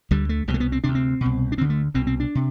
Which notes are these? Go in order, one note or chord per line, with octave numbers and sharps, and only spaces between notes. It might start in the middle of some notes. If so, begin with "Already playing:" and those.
D2 D3 G3
A3
C2 B2 G3
A3
B3
C4
D2 C3 D4
C4
C2 B2
D4
D2 D3 C4
A3
C2 B2 C4
C4
D4
C3